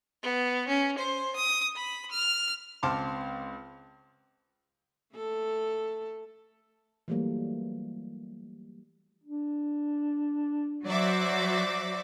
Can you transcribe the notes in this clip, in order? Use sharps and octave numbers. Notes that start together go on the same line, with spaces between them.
B3
C#4
C5
D#6
B5
F6
C#2 C4 A5 C6 D6 F6
A3 A4
E3 F#3 G3 A3 A#3
D4
F#3 F#4 C5 D5 E5 D6